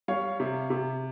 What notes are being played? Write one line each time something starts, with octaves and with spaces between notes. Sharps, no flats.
G3 C#5 F5
C3
C3